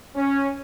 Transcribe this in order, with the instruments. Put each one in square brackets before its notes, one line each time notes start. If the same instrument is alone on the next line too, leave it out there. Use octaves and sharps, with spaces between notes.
[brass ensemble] C#4